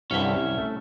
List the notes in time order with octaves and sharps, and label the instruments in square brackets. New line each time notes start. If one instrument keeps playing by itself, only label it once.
[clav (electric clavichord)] C2 G2 D3 [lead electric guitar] C#4 E5
[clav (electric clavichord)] C2
A3